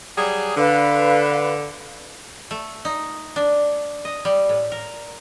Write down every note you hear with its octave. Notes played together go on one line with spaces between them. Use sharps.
F#3 G3 G#4
D3 B4 F5
A3
D#4
D4
D#5
G3
A2
A#4